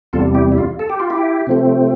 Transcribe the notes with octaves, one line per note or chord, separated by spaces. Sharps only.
E2 C3 G3 F4 A4
E4 G4
E4
F4
A4
G4
F4
E4 G4
C3 F3 A3 C4